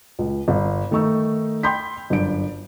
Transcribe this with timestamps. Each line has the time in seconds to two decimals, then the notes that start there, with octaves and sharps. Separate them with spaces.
0.19 C#2
0.48 G1
0.91 D#3 A3 D#4 C#6 E6
1.63 G5 B5 C6 G6 B6
2.10 G1 F#2 D4 D7